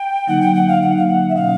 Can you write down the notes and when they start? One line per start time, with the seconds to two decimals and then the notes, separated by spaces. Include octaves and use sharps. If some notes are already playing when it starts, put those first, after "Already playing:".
Already playing: G5
0.27 D3 F#3 A#3 D#4 F#5
0.41 G5
0.55 F#5
0.68 F5
0.82 D3 F#3 A#3 D#4 F#5
0.97 F5
1.08 F#5
1.29 E5
1.35 B2 F#3 A#3 C#4 F5